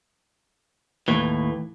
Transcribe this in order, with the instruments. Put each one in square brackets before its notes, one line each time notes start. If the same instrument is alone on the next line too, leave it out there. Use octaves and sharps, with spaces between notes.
[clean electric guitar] D#2 A2 E3